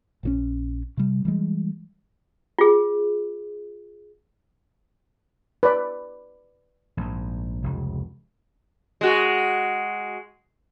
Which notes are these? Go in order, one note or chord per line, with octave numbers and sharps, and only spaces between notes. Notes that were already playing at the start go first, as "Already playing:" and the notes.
A#1 D#3 C#4
C3 G3
E3 G3 G#3
F4 G#4
B4 D5
A#1 G#2
F1 C#2
G#3 F#4